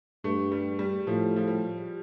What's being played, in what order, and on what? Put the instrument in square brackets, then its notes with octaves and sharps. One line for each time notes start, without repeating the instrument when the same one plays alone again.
[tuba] G2 [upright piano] A3
[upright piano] G3
G3
[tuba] A2 [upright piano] F3
[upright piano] F3
G3